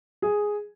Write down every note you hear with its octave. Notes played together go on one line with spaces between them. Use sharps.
G#4